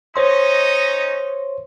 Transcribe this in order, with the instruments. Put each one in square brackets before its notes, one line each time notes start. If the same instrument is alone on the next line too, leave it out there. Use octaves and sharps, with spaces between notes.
[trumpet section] C#4 D#4 D#5 [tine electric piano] C5 C#5 C6